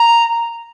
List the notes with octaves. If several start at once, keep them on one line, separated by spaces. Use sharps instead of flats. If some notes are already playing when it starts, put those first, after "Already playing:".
Already playing: A#5